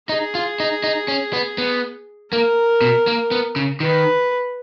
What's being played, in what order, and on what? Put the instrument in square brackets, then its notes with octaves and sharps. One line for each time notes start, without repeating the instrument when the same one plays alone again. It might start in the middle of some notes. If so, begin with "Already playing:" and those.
[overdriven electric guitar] D#4 [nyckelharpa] G#4
[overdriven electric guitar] F4
D#4
D#4
C#4
B3
B3
[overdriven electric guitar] A#3 [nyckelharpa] A#4
[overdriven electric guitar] B2
A#3
B3
C#3
[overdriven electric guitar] D#3 [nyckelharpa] B4